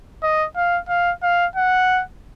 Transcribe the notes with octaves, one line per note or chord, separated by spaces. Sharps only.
D#5
F5
F5
F5
F#5